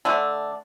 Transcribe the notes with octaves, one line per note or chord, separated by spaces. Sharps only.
D3 A3 D4